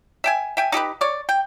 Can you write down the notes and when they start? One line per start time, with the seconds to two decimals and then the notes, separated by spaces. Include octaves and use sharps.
0.24 E5 G5 G#5
0.57 E5 G5 G#5
0.72 D#4 G4 A4 B4
1.01 C#5 D5
1.29 G5